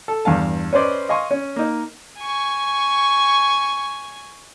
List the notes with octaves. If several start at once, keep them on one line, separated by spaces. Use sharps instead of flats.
A4
E2 G2 F5 A5
C#4 B4 C5 D5 D#5
D#5 F5 G#5 C6 C#6
C#4
A#3 D#4
G#5 C#6